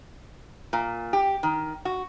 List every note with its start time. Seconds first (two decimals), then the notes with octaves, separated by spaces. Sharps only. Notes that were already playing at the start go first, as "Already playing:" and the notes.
0.73 A#2
1.13 G4
1.43 D#3
1.85 F#4